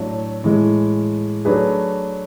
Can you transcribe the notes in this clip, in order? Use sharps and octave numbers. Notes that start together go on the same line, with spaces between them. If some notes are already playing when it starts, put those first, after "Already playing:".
Already playing: A2 F#3 A3 D4
A2 E3 G#3
F#3 A3 D4 G#4 B4